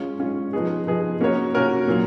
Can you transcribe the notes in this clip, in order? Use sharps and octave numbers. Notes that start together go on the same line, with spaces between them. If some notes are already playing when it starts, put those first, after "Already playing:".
Already playing: G#3 C#4 F4
G#3 C#4 F4
F3 B3 D#4 G#4
F3 B3 D#4 G#4
A#3 C#4 F#4 A#4 C#5
A#3 C#4 F#4 A#4 C#5
A#2 F#3 A#3